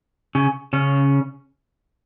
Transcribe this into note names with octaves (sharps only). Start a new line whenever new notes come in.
C#3 C#4
C#3 C#4